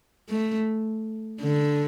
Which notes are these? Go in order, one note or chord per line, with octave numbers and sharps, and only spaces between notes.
A3
D3